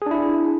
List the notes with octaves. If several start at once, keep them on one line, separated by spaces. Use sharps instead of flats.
D4 E4 G#4